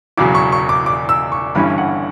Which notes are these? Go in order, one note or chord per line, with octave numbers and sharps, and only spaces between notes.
E1 E2 C#3 F#3 D6
C#6
C#6
D6
D6
E6
C#6
G1 G2 E3 G3 C#4 B5
F#5